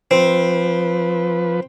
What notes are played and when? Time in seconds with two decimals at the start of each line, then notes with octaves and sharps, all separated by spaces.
0.11 F3 C4 B4